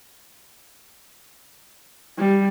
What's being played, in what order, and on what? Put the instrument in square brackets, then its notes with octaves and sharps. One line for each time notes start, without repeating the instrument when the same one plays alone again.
[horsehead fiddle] G3